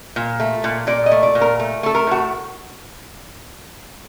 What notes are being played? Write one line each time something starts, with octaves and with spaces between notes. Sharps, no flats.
A#2
A3
A#2
A#2 D5
D#5
A3
D5
A#2
A#4
A3
A3 A4
A#4
A2 F#4